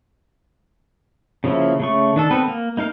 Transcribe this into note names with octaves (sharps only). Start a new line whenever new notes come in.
C#3 F3 A#3 E4
C#3 A3 C#6
D#3 D4 A4
B3 C4 A4 B4
A#3
A#3 D#4 A#4 F5